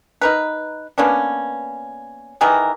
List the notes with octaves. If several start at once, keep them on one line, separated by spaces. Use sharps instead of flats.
D#4 A#4 B4
A#3 B3 C#4 D4
D#3 E3 G#4 A#4